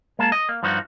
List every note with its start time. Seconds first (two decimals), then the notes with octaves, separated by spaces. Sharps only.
0.19 G#3 A#3 A5
0.32 D#5
0.49 A#3
0.63 G2 F3 D#4 F#4